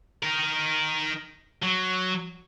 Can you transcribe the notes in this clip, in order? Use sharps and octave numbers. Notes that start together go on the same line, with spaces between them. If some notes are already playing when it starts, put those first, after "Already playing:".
D#4 A#4
F#3